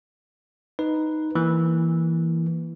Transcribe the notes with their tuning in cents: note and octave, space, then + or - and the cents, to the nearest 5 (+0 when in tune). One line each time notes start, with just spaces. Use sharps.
D#4 +0 B4 +0
E3 +0 A#3 +0